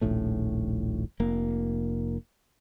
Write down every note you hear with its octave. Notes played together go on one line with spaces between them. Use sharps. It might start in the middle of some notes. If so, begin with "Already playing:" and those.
D#1 A#1 A2 A3
F1 A#3